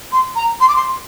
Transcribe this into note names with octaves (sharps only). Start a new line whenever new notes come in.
C6
A#5
C6
D6
C6